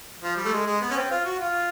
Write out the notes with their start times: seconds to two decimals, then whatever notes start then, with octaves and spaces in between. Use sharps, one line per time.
0.22 F3
0.37 G3
0.45 A3
0.52 G#3
0.67 G#3
0.81 B3
0.91 C#4
0.96 C4
1.10 F4
1.25 F#4
1.40 F4